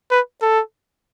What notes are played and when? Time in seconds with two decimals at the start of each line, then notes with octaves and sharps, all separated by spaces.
0.11 B4
0.42 A4